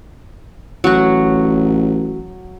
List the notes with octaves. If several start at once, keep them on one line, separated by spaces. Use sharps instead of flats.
A1 F#3 F#4